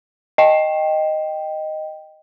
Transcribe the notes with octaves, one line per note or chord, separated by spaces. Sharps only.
D#5 G5